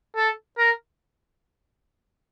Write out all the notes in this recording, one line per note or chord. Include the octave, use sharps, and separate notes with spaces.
A4
A#4